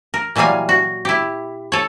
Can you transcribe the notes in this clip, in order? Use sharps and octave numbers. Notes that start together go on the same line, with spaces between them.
A#4
A#2 E3 F#3 G3 F5 G#5
F#4
E4 G4
A4 C#5